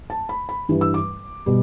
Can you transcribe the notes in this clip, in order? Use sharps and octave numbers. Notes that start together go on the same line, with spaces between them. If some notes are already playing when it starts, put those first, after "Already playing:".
A5
B5
B5
G2 E3 G3
E6
D6
B2 G3